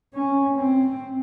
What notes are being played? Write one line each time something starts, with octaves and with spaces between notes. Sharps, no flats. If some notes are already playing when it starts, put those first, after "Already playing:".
C#4
C4